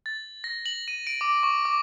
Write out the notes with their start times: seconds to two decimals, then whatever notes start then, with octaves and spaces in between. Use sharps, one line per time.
0.06 A6
0.44 A#6
0.66 F#7
0.88 D#7
1.07 D7
1.21 D6
1.43 C#6
1.65 D6